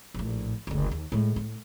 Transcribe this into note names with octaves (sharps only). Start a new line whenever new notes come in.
A#1 A2
F#1 D2
D#2
A2 G#3
A2